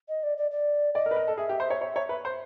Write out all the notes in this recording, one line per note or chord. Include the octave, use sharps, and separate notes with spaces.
D#5
D5
D5
D5
D5 D#5
A#4
B4
A#4
A4
G#4 E5
G4
C5
C#5
C#5
C#5
B4
C5